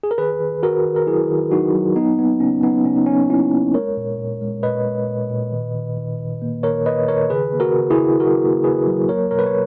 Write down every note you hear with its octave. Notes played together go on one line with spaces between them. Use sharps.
G#4
A#4
D#3 G#4 B4
D#3
D#3 F#4 A#4
D#3
A#4
F#3 E4 G#4
D#3
F#3 D#4 F#4
F#3
F#3 B3 D#4
A#3 B3
C#3 C#4
F#3 B3 D#4
C#3 C#4
D#4
F#3 C#4
A#3 C#4 E4
A#3
G#3 A#4 C#5
A#2
A#2
G#3
A#2 B4 D#5
G#3
A#2
A#2
D#3
D#3
D#3
D#3
A#3
D#3 A#4 C#5
D#3 B4 D#5
D#3 A#4 C#5
C#3 G#4 B4
A#3
F#4 A#4
C#3
E4 G#4
C#3
F#3 F#4 A#4
A#3
C#3 G#4 B4
F#3
A#3 A#4 C#5
B2 A#4 C#5
B4
C#5